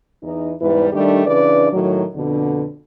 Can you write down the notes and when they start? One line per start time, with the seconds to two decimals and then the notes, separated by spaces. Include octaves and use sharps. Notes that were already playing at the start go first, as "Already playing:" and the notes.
0.23 E2 E3 D#4
0.61 E2 G#2 G3 E4 B4
0.93 D#3 G3 A3 D4 G4
1.27 C#3 E3 D4 B4 D5
1.73 A2 D#3 F#3
2.15 F2 B2 D3